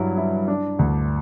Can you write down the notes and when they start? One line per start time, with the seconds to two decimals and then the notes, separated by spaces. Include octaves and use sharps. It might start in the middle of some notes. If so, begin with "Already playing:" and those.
Already playing: G2 F#3 E4
0.17 E4
0.48 D4
0.79 D2